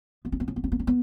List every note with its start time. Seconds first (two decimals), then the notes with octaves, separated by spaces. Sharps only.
0.25 B3
0.32 C#4
0.40 B3
0.48 C#4
0.56 B3
0.64 C#4
0.72 B3
0.79 C#4
0.87 B3